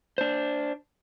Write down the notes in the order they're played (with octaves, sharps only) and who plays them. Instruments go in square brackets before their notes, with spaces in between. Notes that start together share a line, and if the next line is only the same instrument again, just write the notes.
[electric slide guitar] D4 C5